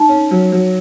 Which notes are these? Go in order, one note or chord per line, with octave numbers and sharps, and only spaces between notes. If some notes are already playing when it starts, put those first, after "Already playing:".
Already playing: D#4
C#4
F#3
F#3